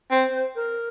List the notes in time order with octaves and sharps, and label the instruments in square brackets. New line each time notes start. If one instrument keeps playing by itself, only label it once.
[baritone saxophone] C4 [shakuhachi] C5
[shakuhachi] A#4